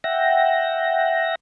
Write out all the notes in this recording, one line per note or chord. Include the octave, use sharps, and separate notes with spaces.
E5 F#5 G5 A#6